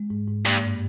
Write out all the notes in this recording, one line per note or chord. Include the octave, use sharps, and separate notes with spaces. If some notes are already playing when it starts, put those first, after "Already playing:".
Already playing: G#3
G#2
G#2
G2 A#3
G2